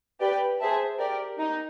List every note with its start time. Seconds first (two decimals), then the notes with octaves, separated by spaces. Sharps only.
0.21 G4 B4 D5 G5
0.60 G#4 C5 E5 A5
0.99 G4 A#4 D5
1.39 D#4